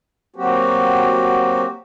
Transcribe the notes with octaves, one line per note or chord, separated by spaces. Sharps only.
F#3 A#3 C4 F#4 G4